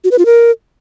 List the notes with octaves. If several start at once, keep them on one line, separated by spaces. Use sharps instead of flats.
F#4
B4
F4
A#4